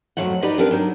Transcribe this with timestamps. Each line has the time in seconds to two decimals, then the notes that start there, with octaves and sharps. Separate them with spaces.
0.17 F2 A2 F3 F#3 F#4 F#5
0.42 D#4 G4 B4 D5 D#5
0.58 B3 C4 D4 A#4 B4
0.71 F#3 D4 D#4